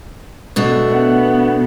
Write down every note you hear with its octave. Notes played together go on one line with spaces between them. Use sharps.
B2 A3 D4
B3